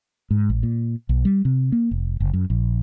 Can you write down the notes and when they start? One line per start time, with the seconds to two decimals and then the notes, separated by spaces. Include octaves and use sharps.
0.31 G#2
0.49 A1
0.63 A#2
1.09 B1
1.25 G3
1.45 C3
1.72 A#3
1.91 F1
2.20 F#1
2.33 F#2
2.50 A#1